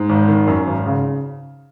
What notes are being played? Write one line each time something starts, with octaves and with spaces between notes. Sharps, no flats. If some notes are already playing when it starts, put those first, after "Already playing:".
Already playing: G#2
G#1
D#3
F#2
G#1
C#3